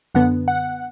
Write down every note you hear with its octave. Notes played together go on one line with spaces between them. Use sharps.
F#2 D3 B3 F#5
F#5